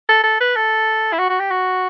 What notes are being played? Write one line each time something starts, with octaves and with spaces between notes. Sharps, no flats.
A4
A4
B4
A4
E4
F#4
F#4
G4
F#4